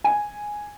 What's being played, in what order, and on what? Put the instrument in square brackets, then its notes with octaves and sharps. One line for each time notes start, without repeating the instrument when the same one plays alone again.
[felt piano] G#5